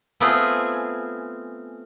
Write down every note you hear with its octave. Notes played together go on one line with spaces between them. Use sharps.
A3 B3 C4 F4 G#4